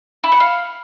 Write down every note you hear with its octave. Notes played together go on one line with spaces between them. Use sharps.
E4
F#5
F5